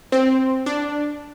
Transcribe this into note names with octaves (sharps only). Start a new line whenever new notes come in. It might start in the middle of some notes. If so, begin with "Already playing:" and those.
C4
D4